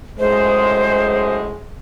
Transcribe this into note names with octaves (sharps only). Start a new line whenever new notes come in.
F#2 A2 G#3 C5